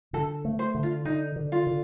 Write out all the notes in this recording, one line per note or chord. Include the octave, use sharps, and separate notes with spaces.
D3 A4
A3
C5
D3
F4
D3 D#4
D3
F4
D3